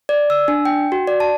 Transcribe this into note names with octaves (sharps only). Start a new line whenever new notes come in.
D5
E6
D4
G5
F#4
D5
A5